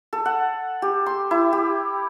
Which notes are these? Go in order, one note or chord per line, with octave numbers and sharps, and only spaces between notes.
A4
F#5
G4
C6
E4
G4